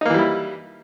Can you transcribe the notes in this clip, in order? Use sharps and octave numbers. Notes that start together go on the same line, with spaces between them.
E3 G3 A#3 D#4 E4